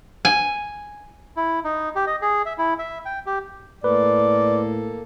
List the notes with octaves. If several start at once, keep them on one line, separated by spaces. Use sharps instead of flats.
G#5
E4
D#4
G4
D#5
G#4
E5
E4
E5
G5
G4
A2 A#3 A4 B4 D5